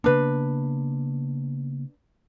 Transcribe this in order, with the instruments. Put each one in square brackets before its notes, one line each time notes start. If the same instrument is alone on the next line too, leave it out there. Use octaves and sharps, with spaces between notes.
[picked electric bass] C#3 A#3 B3 [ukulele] D4 B4